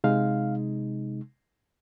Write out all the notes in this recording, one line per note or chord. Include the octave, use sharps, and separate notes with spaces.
C3 G#3 D#4 F5